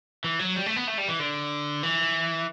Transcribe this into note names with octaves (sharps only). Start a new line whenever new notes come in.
E3
F#3
G3
A3
B3
A3
G3
E3
D3
E3